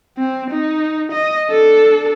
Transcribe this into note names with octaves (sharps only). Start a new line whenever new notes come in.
C4
D#4
D#5
D4 A4